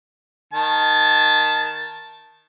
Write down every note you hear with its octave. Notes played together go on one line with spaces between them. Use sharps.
D#3 A5